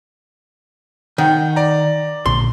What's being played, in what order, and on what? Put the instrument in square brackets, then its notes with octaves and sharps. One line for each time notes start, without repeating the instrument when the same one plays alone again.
[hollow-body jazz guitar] D#3 [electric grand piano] F#5 G5
[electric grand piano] D5 A#5
[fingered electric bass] A#1 A#2 D3 [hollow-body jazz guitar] C6